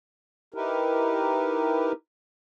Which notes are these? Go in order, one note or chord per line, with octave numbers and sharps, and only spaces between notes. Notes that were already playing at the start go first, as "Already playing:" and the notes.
D#4 E4 G4 A#4 B4